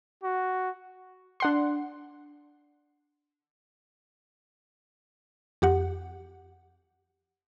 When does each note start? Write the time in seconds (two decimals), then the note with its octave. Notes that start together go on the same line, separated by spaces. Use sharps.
0.23 F#4
1.40 D4 F#5 C6
5.62 F2 G4 F#5